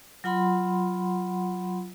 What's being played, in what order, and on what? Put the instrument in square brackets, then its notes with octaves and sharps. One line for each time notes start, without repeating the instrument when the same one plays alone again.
[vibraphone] F#3 F4 F#5 B5 C6